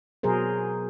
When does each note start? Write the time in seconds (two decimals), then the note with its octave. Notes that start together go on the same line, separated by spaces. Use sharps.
0.23 B2 F#3 G#4 A#4 C5